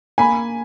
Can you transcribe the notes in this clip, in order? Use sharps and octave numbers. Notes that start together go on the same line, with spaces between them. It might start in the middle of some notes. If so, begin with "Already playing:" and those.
A#3 G#5 B5